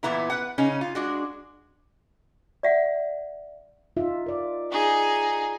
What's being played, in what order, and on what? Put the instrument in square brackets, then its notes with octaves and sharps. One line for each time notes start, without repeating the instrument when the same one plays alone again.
[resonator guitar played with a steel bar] A#2 E3 B3 E4 A#5
B4 F#5
C#3 C#4 D#4
F4
G#3 D4 F#4
[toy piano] D5 E5 F#5
[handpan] D#4 F4 E5
A#4 D5
[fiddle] D#4 G#4